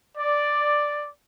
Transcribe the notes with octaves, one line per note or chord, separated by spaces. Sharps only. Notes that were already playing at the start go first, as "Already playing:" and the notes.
D5